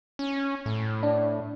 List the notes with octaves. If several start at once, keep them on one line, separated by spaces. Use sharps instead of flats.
C#4
A2
D4